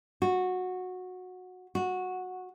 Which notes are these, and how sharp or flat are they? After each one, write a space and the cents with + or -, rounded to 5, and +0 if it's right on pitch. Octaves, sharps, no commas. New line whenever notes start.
F#4 -15
F#4 -10